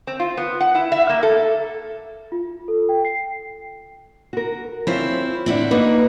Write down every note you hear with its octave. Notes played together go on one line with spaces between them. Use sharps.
C4
F4
B3
F#5
E4
E5
A#3
A4
F4
A4
G5
C7
F#4 A#4
C4 C#4 E4 F4 C5
A2 C4 D4 E4 F#5
A#3 D#4 F#4 B4